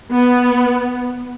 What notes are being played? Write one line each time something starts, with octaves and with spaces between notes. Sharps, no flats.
B3